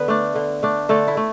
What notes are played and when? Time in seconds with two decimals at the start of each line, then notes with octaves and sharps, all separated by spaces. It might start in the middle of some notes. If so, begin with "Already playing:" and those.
Already playing: D3 B3 B4
0.08 A3 D4
0.35 D3
0.63 A3 D4
0.89 D3 A3 A4
1.08 E4
1.17 A3